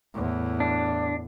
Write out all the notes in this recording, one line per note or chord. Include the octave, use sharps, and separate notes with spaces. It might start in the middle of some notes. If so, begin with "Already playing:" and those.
E2 A2
D4